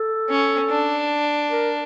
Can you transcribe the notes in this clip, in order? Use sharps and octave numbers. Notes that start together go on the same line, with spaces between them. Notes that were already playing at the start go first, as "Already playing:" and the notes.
Already playing: A4
C#4
D4
A#4